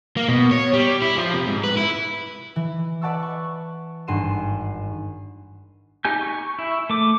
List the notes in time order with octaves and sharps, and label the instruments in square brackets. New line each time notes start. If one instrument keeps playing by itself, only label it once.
[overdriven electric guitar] A#3
B2
C#5
G3
E4
F3
C3
G#2
B4
E4
[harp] E3
B4 D5 F#5 A5 C#6 E6
C#6
G#1 G2 F#5 C6 D#7 E7
[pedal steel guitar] D#4 G4 G#5 G6
C#6
E4
A3 D6